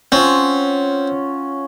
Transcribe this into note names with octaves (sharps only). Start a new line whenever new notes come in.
C4 C#4 F4 F#5